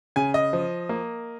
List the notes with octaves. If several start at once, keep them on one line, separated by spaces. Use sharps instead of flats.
C#3 G#5
D#5
F3
A#3